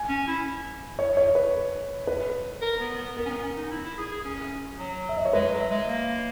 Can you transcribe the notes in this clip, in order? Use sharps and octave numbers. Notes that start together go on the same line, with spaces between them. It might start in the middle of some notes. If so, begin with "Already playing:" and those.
Already playing: G#5
C#4
E4
C#5
C#5
B4
B4
A#4
B3
B3
B3 A#4
C#4
B3
C#4
D#4
E4
E4
G#4
G#4
C#4
F#3
E5
D#5
C#5
G#3 B4
F#3
E5
G#3
A#3